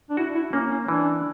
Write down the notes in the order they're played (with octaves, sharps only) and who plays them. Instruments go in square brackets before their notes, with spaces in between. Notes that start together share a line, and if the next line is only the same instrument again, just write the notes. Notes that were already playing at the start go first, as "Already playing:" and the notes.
[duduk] D4
[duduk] E4 [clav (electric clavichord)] F#4
[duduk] E4
[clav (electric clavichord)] A#3 [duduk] C#4
[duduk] C#4
[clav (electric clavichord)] E3 [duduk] D4